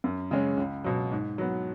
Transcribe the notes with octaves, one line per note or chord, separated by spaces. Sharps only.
F#2
C#3 G#3 C#4
C#2
B2 F#3
G#2
F#3 B3